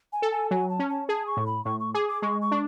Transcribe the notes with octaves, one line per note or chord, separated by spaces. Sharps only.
G#5
A4
G#5
F#3 G#5
A5
C#4
A5
G#4 A5
C#6
A2
B5
A2 C#6
C#6
G#4 D6
D6
G#3 C#6
C#6
D4